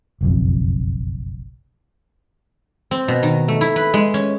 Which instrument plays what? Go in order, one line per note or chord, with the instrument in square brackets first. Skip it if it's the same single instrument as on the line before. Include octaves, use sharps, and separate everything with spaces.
[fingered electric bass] F#1 B1 F2
[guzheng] C4
B2
D#3
A3
E4
B4
G#3
C#4